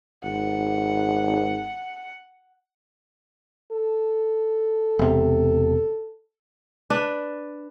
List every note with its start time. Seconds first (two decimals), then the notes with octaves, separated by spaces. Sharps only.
0.24 G#1 F#5
3.72 A4
4.99 E1 C3
6.90 D4 B4